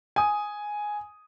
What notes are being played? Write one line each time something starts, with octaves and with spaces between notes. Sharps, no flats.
G#5 D#6